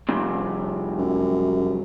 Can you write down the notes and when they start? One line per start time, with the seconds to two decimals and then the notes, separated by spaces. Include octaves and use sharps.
0.09 C2 F2 C3
0.98 F#2